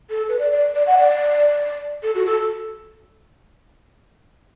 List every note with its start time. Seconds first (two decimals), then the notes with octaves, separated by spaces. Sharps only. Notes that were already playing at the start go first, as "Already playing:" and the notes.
0.10 A4
0.29 B4
0.39 D5
0.52 D5
0.75 D5
0.87 F#5
0.98 D5
2.03 A4
2.15 F#4
2.26 A4